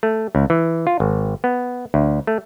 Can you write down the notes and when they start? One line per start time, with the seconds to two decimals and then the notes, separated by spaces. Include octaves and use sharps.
0.03 A3
0.35 C#2
0.50 E3
0.87 F4
1.00 G#1
1.44 B3
1.94 D2
2.27 A3